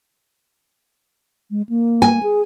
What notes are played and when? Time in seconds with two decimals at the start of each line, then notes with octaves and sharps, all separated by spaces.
1.51 G#3
1.69 A#3
2.02 G#5
2.23 G#4